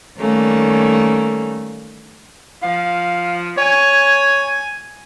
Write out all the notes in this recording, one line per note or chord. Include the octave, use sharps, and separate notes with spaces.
D#3 G3 A3 A#3 C#4
F3 F5
C#5 G#5